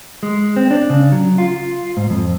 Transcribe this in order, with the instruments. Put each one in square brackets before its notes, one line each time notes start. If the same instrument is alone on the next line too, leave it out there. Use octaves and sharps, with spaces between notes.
[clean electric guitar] G#3
C4
D4
C#3
F#3
F4
G#2
F2